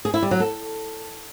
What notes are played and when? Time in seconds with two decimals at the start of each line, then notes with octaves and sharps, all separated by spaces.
0.05 G#4
0.14 E4
0.22 G3
0.31 F#3
0.40 A4